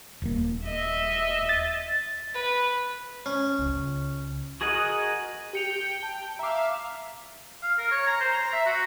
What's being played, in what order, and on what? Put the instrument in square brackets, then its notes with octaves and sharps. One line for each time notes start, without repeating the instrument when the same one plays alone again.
[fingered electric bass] D#1 A#3
[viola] D#5 E5
[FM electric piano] A6
[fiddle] B4
[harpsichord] C#4
[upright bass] C#2
[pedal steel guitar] F#4 G#4 A#4 D#5 F#5
[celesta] G4 C#7 F7 [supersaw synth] G5
[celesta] A5
[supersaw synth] E5 F5 [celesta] A#5 D6
[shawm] F5
A#4
C#5
A#5
C5
A#5
E5
F#4